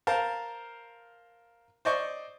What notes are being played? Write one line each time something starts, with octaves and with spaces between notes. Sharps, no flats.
A#4 C5 F5 A5
C5 D5 D#5 C#6